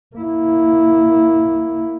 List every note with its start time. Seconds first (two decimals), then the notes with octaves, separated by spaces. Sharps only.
0.16 A#3 E4